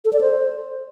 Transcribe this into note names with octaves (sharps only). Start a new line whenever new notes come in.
A4
D5
C5